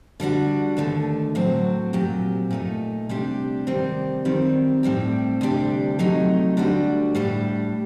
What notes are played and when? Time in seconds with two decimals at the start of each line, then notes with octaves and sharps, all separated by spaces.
0.20 D3 G3 D4 F#4
0.77 D#2 D3 A3
1.35 A2 F#3 C4 F#4
1.93 A#2 F#3 C4 G4
2.51 A#2 A3 D#4
3.09 C3 G3 D4 G4
3.67 C3 D#3 G3 C4
4.25 F#2 D#3 G3 C4
4.83 A2 G3 C4 G4
5.41 D2 C3 G3 D4 G4
5.99 C3 F#3 A3 D#4
6.57 D2 D3 G3 D4 F#4
7.15 A2 G3 D4 G4